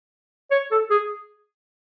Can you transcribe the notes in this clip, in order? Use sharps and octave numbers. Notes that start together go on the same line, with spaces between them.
C#5
A4
G#4